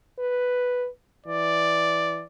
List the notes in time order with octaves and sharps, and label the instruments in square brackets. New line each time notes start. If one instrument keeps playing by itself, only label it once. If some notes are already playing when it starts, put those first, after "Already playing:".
[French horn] B4
[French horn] E3 [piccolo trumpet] D5